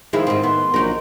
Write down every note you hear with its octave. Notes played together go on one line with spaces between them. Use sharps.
D#3 F3 G#3 E4
G#2 C4
B3 C6
A#1 F#3 D#4 A#4